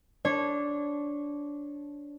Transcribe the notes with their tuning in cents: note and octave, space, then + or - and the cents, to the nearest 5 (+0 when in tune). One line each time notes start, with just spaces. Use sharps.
D4 -15 C#5 -20